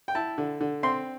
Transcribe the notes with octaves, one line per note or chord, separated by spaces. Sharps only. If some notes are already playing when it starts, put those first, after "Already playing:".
G5
E4 A5
D3
D3
C4 C6